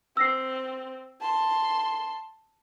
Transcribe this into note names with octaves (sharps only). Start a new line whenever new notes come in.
C4 E6 A#6 C7
A5 C6